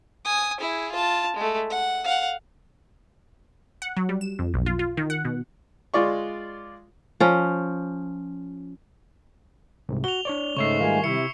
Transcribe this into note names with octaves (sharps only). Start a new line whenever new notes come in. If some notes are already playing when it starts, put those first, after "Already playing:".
G#5 D#6
E4 G#4
F4 A5
G#3 A3
F#5
F5 F#5
F#5
F#3
G3
E7
F2
B1
F4
F4
D#3
F#5
B2
G#3 F4 D5 C#6
F3 C#4
C2 G#2 C3
F#4 F7 G7
D4 C#5 D5
G#2 C#3 G#3 A3 C#5 C#6 E6 C7
D#3 G3 F4 A#4 G#5
C3 E4 C#7